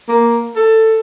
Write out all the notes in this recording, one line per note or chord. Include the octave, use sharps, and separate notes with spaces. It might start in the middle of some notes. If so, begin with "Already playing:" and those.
A#3
A4